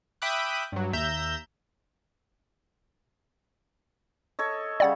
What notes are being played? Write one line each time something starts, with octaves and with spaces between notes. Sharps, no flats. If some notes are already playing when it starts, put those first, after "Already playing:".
E5 G5 B5 D6 D#6 F#6
G2 F#3
D#2 E5 A#5 G6 E7
A4 C#5 D#5
C#3 G3 D5 F#5 G#6